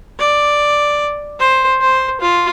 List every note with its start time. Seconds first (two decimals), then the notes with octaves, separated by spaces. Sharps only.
0.19 D5
1.40 C5
1.81 C5
2.21 F4